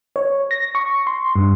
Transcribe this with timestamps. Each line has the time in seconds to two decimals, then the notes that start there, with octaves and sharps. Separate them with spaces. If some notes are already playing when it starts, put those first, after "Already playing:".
0.16 C#5
0.51 A#6
0.75 C#6
1.07 C6
1.36 G2